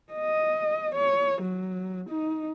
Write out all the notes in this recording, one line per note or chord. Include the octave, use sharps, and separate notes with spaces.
D#5
C#5
F#3
D#4